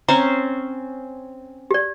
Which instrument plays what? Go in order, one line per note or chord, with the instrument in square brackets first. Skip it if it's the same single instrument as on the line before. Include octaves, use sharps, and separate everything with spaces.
[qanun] C4 C#4 C5 [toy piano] A#5
[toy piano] G4 D5